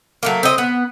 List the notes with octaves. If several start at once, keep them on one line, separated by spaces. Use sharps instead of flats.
F#3 A3 A#3
C4 D#5
B3